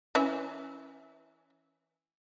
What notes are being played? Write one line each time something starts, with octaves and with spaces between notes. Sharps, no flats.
E3 C#4 E5